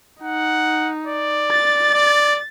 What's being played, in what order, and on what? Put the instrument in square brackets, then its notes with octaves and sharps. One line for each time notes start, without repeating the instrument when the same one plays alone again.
[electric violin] D#4 [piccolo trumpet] F#5
[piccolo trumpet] D5
[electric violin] A6
[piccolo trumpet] D5